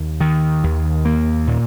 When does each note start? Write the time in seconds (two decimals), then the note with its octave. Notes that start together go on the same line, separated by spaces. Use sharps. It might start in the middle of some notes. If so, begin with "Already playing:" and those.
Already playing: D#2
0.20 D#3
0.64 D#2
1.05 A#3
1.47 A#2